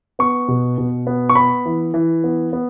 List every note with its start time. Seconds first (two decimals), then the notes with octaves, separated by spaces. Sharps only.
0.19 B3 C#6
0.48 B2
0.78 B2
1.07 B3
1.29 C#6
1.35 B3 B5
1.66 E3
1.94 E3
2.24 B3
2.53 B3